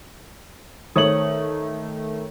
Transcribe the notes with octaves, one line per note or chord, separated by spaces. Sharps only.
D#3 A3 C#5 D#6 F#7